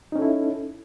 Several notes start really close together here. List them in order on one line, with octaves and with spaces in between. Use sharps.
D#4 C#4 A4 E4